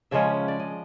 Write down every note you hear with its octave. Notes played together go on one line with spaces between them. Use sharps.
C#3 F3 G#3 C#4 E5
D5
D#5